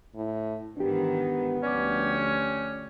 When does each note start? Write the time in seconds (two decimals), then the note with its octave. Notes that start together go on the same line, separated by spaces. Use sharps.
0.15 A2
0.77 G#2 D#3 E3 B3 D4 G4
1.63 D2 F3 C#4 G4 D5 D6